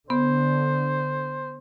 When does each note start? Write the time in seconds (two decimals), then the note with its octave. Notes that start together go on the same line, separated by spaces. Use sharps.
0.10 D3 B3 C5